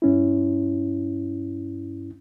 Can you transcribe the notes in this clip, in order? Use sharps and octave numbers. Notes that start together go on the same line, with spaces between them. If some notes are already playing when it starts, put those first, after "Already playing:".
G2 C#4 E4